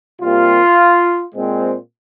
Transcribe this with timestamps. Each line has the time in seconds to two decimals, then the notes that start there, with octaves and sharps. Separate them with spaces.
0.20 C3 G3 A#3 F4
1.35 A#2 G#3 C4